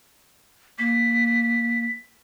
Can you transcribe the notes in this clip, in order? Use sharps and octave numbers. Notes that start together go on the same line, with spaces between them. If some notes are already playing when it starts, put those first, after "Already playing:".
A#3 B6